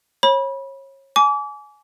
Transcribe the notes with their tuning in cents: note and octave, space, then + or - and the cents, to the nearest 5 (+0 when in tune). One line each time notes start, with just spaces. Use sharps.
C#5 -30 B5 -25
G#5 +20 D6 -30